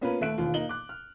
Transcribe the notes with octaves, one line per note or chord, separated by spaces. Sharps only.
A#3 B3 C#4 F4 A#4 B4
D#2 A3 E5 F#6 D7
E1 D#2 F4
A#3 D#4 F#7 G7
D6 F#6
F6